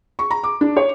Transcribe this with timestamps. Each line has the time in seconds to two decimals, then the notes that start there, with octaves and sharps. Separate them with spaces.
0.19 C#6
0.31 A#5
0.43 D6
0.61 D4
0.76 C#5